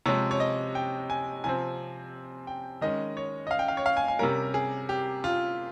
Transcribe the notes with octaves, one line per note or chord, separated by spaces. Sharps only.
C3 F3 G#3 C#5
C#5
D#5
G5
G#5
C3 F3 C4 G#5
G5
D#3 G#3 C#4 D#5
C#5
D#5
F5
G5
F5
C#5
F5
G#5
G#5
C3 G3 C#4 A#4
G#4
G4
F4